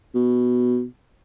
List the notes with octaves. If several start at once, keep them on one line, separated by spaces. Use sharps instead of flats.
B2